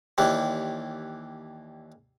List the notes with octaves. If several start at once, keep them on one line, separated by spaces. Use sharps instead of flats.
D#2 E3 G3